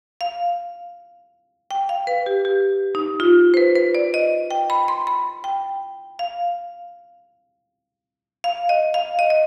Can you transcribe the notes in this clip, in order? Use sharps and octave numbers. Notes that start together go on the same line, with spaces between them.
F5
G5
F5
B4
G4
G4
D#4
F4
C5
B4
B4
D5
D#5
G5
B5
C6
B5
G5
F5
F5
D#5
F5
D#5
D#5